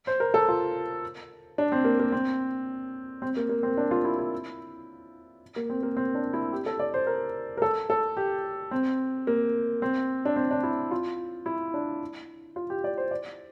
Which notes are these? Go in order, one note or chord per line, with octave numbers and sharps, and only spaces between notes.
C5
A#4
A4
F4
D4
C4
A#3
A#3
C4
C4
A#3
A#3
C4
D4
F4
E4
E4
A#3
C4
A#3
C4
D4
E4
G4
A4
D5
C5
A#4
A#4
A4
A4
G4
C4
A#3
C4
D4
C4
D4
E4
F4
E4
D4
F4
G4
D5
C5
D5